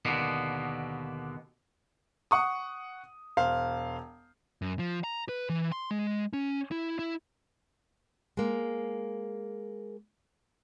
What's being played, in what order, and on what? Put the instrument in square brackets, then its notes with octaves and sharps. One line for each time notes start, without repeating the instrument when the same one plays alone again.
[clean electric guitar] D#2 B2 D3 A#3 B3
[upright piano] F#5 C#6 D#6
E1 C5 F5
[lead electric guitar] F#2
F3
A#5
B4
E3
C6
G#3
C#4
E4
E4
[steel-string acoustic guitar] G#3 A#3